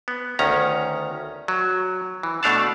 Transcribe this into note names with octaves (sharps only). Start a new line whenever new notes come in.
B3
D2 D#3 C#4 A#5
F#3
E3
B2 A3 D4 F5 F#5 A5